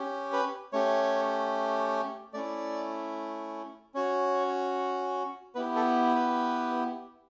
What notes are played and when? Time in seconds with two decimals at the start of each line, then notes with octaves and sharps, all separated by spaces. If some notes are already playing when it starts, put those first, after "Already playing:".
Already playing: C#4 G4
0.33 B4
0.73 A3 C#4 G4 C#5
2.34 A3 C#4 E4 D5
3.94 C#4 F#4 C#5
5.55 B3 E4 G4 B4
5.76 A4
6.16 B4